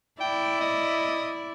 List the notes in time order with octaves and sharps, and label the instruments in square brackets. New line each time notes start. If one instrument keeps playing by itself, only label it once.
[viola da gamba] E4 D5 [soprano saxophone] G5
[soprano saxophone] D#5